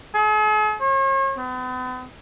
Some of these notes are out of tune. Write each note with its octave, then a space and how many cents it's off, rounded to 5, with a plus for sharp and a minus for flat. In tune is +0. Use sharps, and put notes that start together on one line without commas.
G#4 +45
C#5 -40
B3 +45